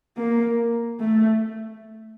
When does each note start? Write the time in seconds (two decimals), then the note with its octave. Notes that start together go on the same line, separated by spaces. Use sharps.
0.17 A#3
1.00 A3